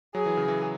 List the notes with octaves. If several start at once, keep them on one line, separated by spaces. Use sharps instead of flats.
F#3 G#4
E3
C#3
E3